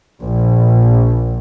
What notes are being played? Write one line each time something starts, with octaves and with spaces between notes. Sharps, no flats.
A#1